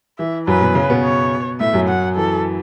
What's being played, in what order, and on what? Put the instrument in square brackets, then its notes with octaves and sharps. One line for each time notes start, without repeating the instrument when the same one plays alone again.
[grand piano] E3 [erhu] E5
[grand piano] F#2 F#3 [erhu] B4
[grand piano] B2 B3
C#3 C#4
B2 B3
[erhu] C#5
[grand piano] A2 A3 [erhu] E5
[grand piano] F#2 F#3
[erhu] F#5
[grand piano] E3 [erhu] A4